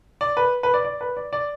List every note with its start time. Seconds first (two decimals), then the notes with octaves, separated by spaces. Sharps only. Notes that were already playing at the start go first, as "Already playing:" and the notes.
0.21 D5
0.37 B4
0.63 B4
0.74 D5
0.85 D5
1.01 B4
1.17 D5
1.33 D5